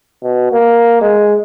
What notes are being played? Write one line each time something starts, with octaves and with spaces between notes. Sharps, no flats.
B2
A#3
G#3